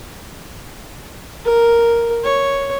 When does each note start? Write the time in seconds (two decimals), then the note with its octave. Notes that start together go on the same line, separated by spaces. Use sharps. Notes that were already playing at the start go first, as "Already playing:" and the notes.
1.45 A#4
2.24 C#5